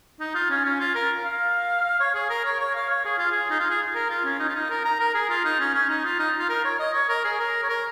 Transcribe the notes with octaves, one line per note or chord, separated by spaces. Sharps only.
D#4
F4
C#4
C#4
F4
A#4
F5
C#5
G#4
A#4
C#5
C#5
F5
C#5
G#4
F4
G#4
D#4
F4
G#4
A#4
F4
C#4
D#4
F4
D#4
A#4
A#5
A#4
G#4
F4
D#4
C#4
C#4
D#4
F4
D#4
F4
A#4
C#5
D#5
C#5
A#4
G#4
A#4
C#5
A#4